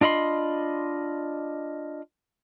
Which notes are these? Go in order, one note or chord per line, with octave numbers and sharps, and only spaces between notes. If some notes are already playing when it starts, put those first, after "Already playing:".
D4 F4 D#5 B5 C6